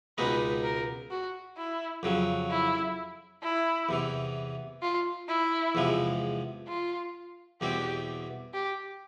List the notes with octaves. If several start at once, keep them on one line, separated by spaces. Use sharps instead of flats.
C#2 B2 G#3 C4 D#4 B4
A#4
F#4
E4
F2 C#3 F#3
E4
E4
E2 C3 E3
F4
E4
E2 C3 F3 G#3
F4
E2 B2 G3 C4 G4
G4